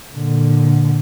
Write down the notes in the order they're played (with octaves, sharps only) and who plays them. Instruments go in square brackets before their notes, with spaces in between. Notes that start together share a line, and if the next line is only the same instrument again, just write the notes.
[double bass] A#2 D3